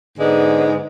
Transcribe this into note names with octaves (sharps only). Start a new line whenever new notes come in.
G#2 D3 G#3 B3